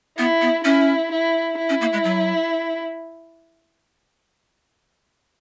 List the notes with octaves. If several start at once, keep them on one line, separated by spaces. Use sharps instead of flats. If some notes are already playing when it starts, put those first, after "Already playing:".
B3 E4
B3
C#4 E4
E4
E4
C#4
A#3
G#3
F#3